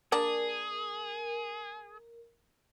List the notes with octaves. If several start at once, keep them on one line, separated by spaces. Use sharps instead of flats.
A#3 D4 G#4 A#4 D5